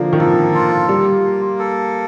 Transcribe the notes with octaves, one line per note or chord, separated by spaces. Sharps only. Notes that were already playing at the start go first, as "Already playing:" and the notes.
Already playing: D3 F3 A#3
D#3
F3 A4
F4
G3 A#3
A#3
A4